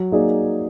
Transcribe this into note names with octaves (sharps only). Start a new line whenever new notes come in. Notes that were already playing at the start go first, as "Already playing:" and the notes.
Already playing: F#3
A#3 D#4 G#4 D5